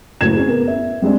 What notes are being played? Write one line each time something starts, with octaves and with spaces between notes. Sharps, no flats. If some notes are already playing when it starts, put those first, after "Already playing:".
F#1 A2 F#4 G#6 E7
C#4 G#4
B3 A#4
E5
G3 G#3 C4 D4